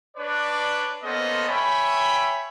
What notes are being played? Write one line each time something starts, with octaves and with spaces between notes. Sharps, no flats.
D4 B4 C#5 D5
A#3 B3 C#4 A4 C5 D#5
C#5 E5 G5 G#5 B5